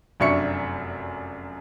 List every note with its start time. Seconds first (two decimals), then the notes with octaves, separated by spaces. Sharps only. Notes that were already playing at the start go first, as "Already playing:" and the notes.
0.20 F1 F#2 D4 E5 C#6 C#7